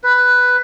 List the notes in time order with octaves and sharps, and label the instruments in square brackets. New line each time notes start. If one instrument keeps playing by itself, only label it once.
[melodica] B4